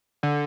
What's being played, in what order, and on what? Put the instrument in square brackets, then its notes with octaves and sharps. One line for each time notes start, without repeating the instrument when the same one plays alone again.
[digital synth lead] D3